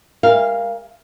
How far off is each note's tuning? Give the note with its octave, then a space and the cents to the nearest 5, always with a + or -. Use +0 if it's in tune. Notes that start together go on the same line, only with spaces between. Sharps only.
G#3 -45 A#4 +10 F5 -10